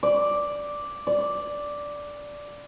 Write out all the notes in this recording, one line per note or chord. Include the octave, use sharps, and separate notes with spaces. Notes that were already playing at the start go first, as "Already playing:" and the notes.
D5
D5